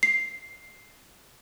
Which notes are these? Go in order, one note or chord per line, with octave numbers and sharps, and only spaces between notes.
C7